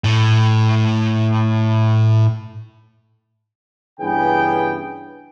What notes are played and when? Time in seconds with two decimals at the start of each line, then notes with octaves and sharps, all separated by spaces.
0.04 A2 A3
4.00 G2 C#3 E3 B3 G#4 G5